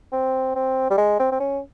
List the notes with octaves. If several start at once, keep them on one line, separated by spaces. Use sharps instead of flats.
C4
C4
G3
G#3
C4
C4
C#4